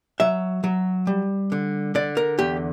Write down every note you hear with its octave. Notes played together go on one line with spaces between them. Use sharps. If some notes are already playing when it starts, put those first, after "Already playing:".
F#3 E5
F#3
G3
D3
D3 D5
A#4
E2 G4